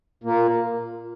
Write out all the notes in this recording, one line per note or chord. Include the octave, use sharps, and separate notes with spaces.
A#2 A#3